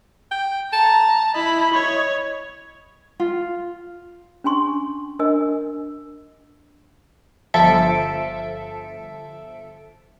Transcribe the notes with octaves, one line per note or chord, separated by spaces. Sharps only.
G5
A5 A#5
E4 D#5 B5
C#5
F4
C#4 D4 G#5 C6 C#6
D4 A#4 D#5 G#5 E6
G1 F3 A4 E5 D7